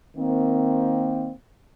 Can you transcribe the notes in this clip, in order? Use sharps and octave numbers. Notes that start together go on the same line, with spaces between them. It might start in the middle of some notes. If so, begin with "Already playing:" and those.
D#3 A#3 C4